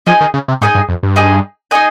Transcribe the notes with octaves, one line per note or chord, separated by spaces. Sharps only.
F3 D#4 G#4 D#5 G#5
D#3
C#3
C3
G#2 D#4 G#4 D#5 G#5
G2
F2
G2
D#4 G#4 D#5 G#5
D#4 G#4 D#5 G#5